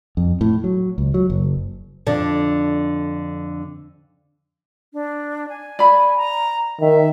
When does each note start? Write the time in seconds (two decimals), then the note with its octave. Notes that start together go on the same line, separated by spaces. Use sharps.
0.17 F2
0.41 A2
0.64 F#3
0.98 C#2
1.14 F#3
1.30 F#1
2.06 F2 D3 D4
4.93 D4
5.49 G#5
5.79 D5 B5
6.17 A#5
6.80 D#3 E5